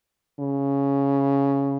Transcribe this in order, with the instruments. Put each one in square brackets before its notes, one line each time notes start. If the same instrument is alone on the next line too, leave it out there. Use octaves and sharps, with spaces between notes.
[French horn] C#3